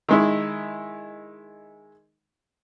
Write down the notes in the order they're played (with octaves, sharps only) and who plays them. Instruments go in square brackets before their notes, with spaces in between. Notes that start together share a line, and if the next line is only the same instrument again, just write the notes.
[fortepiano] D#3 G#3 E4